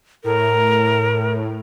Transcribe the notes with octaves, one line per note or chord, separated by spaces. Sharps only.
A2 A#4